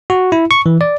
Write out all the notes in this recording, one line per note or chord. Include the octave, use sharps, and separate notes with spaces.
F#4
E4
C#6
E3
D5